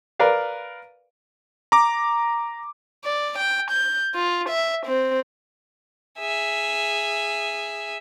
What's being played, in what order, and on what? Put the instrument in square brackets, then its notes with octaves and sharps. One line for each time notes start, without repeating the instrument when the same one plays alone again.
[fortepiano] A#4 B4 D5 F5
[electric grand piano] A#5 D6
[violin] D5
G5
G6
F4
E5
C4
[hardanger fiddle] G#4 E5